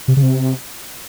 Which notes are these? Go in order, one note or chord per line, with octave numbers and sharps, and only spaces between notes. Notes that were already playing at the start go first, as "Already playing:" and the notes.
C3
C#3
C3